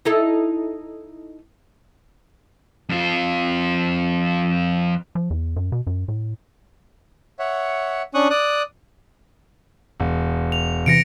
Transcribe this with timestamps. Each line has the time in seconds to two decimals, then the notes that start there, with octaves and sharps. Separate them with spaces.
0.05 D#4 E4 A4
2.89 F2 F4
5.15 F3
5.30 E2
5.56 F#2
5.72 B2
5.87 F#2
6.08 A2
7.39 C#5 E5 F#5
8.14 C#4 D4 C#6 D#6 F#6
8.30 D5 D#6 F#6
10.00 E1
10.52 F7
10.86 C3 E3 A#6 C#7 D7